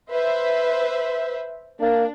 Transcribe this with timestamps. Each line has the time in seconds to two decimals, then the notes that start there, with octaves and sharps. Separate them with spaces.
0.11 B4 C5 E5
1.81 A#3 D4